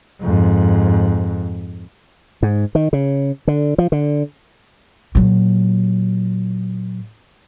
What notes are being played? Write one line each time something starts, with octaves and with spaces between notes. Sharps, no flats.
F2 G#2
G#2
D#3
C#3
D3
F3
D3
A#2 F#3